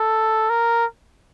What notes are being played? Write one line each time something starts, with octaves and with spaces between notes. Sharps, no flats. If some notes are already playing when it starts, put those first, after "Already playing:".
Already playing: A4
A#4